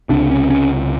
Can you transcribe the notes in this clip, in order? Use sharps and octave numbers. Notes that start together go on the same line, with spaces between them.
C#2 C3 D4
C#4
C#4